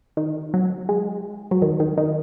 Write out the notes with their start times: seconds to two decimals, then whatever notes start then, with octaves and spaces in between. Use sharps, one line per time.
0.17 D#3
0.54 F#3
0.89 G#3
1.51 F#3
1.62 D#3
1.80 D#3
1.98 D#3